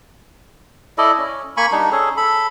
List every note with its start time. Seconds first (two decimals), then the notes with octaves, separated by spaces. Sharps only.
0.98 E4 A4 D5 D#5
1.18 C#4
1.57 A#3 G#5 B5 C#6
1.72 G3 D4 D#4
1.92 C#4 G#4 A4
2.17 A4 B5